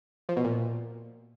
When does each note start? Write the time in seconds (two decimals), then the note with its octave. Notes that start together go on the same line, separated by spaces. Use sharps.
0.29 F3
0.36 B2
0.44 A#2